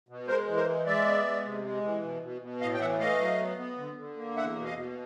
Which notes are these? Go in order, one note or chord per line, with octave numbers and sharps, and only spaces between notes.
B2
G#3 A#4 C5
E3
A#4 C5
G#3
G#3 D5 E5
B3
G#3
C3
G#3
E3
B2
B2
B2
A2 D#5 F5
G5
E3 E5 F#5
A3 D#5 F5
F#3
B3
B3
D3
D3
A#3
E2 E5 F#5
B2
D#5 F5
B2